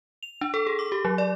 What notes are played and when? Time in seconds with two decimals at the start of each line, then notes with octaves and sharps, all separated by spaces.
0.23 F7
0.41 D4
0.54 A4
0.67 G#4
0.79 D6
0.92 G4
1.05 F#3
1.18 D5